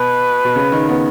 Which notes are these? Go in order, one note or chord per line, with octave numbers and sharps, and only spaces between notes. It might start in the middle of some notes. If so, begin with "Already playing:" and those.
Already playing: B2 B4
B2
C#3
D#3
B3